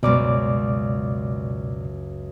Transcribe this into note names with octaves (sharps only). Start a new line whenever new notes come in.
C#2 F#2 B2 G#3 D5 D6